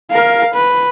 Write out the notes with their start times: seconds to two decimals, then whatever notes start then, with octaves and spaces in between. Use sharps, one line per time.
0.11 A#4 F5
0.54 B4